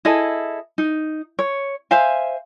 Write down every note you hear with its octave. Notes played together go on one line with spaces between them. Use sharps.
E4 G#4 A4 D#5
D#4
C#5
C5 E5 F5 G#5